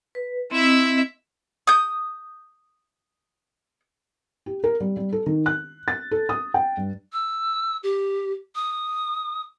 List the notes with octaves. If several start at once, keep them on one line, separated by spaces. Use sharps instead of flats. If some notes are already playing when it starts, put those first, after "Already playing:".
B4
C4 E4 D#5 E5
D#6 G6
G4
A#4
G3
G3
A4
D#3
F#6
A6
A4
D#6
G5
G2
E6
G4
D#6